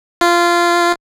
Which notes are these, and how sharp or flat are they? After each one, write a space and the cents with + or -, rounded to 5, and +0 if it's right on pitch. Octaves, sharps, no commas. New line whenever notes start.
F4 -15